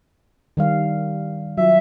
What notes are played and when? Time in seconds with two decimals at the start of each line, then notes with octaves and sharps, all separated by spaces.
0.57 D#3 G3 F5
1.57 F#3 F4 E5